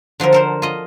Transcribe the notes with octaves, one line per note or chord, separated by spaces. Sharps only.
D3 F3 F#3 A#4
A4 A#4 C5
F4 D#5